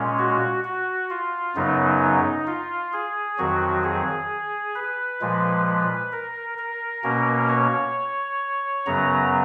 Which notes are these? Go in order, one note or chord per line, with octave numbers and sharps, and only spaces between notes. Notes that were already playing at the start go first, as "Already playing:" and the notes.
Already playing: A#2 G#3 C#4
F#4
F#4
F4
F#2 C#3 F#3 B3 D#4
F4
G#4
F2 D#3 F#3 F#4
G#4
B4
A#2 F3 G#3
B4
A#4
A#4
B2 A#3 C#4
C#5
F#2 C#3 F#3 B3 A#5